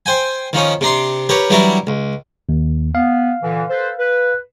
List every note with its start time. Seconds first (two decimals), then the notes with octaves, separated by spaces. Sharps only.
0.06 C5 G5 G#5
0.53 D#3 F3 C#4 D#4
0.81 C3 D4 A#5 C6
1.29 G4 A#4 B4 C#5
1.50 E3 F#3 G3 D4 E4 A#4
1.87 C#2
2.49 D#2
2.95 B3 F5
3.43 A#2 D3 E3
3.70 A4 B4 C5
3.99 B4